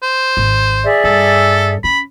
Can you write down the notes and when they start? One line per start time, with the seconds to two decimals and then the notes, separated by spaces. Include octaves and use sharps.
0.02 C5
0.37 G#1
0.84 G#4 D5 E5
1.04 G2 A4
1.84 C#4 B5